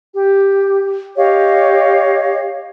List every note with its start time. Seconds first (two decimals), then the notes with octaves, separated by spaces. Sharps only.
0.13 G4
1.16 G4 C#5 D#5 F5